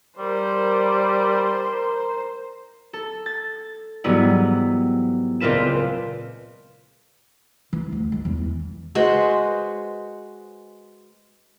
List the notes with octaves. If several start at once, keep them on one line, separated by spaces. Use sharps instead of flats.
G3 A#4 C5
A4
A6
G#2 E3 F#3 G3 B3 E4
C#2 A#2 C4 F4 B4 E7
E3
D2
G#3
E2
E3
G#3 F#4 B4 C5